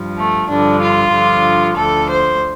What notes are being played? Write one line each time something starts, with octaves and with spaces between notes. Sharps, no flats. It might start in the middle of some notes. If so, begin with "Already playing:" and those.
Already playing: G2 F3
A3
G2 D3 F3 D4
F4
G2 D3 F3
D2 D3 F3 A4
C5